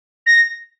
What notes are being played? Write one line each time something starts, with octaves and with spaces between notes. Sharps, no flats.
A#6